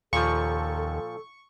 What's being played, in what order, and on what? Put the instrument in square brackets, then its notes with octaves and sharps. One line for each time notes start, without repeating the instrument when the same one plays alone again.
[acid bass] D#2 [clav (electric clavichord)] A#2 F3 [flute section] A4 [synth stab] C#6